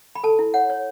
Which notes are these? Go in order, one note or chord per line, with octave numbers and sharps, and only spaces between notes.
B5
A4 A5
E4
C#5 F#5
C#5